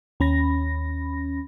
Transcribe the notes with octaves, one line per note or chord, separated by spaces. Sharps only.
D#2 C#4 B5 A#6